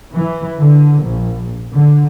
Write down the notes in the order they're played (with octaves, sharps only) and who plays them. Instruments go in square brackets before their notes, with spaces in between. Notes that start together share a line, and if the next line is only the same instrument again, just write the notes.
[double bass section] E3
D3
A#1
D3